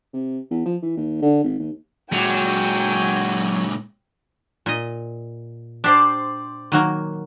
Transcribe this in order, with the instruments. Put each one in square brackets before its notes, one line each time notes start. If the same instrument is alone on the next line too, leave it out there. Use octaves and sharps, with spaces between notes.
[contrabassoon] C3
E2
F3
E3
D#2
D3
G#1
D#2
[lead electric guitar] A#2 G#3 [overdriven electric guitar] F#3 [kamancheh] G5 G#5
[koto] A#2 D#5
[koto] D4 G4 [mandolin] C5 D5 D6
[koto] D#3 F#3 A#3